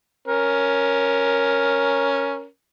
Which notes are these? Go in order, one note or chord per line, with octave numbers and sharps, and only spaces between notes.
C#4 A#4